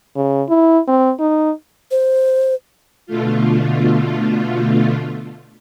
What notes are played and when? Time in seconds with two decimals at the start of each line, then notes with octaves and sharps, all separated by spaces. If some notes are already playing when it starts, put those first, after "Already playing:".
0.16 C#3
0.49 E4
0.88 C4
1.20 D#4
1.91 C5
3.06 B2 D3 A3 F4